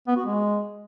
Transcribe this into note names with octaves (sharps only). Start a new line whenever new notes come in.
B3
F#4
G#3